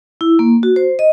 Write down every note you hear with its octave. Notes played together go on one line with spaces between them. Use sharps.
E4
A#3
F#4
C5
D#5